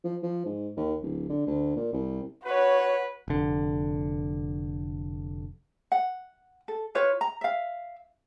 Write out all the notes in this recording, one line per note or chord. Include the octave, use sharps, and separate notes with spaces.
F3
F3
G#2
D#2
D1
D3
D2
A#2
C2
F#4 B4 C#5
F1 D3
F#5
A4
F4 B4 C#5
A#5
E5 F5